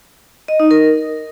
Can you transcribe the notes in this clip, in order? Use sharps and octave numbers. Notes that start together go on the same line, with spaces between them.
D#5
D#4
A#4